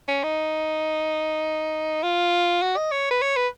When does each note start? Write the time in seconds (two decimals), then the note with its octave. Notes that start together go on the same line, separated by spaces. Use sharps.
0.08 C#4
0.23 D#4
2.03 F4
2.62 F#4
2.77 D#5
2.91 C#5
3.11 B4
3.22 C#5
3.36 B4